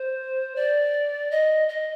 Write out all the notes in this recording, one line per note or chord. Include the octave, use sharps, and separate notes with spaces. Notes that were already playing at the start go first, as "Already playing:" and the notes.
Already playing: C5
D5
D#5
D#5